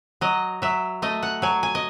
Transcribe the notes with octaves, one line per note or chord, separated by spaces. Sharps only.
F#3 D#5
F#3 E5
A3 D#5
F#5
F#3 G#5
G#5
D#5